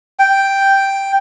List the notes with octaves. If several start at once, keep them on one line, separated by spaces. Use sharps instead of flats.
G5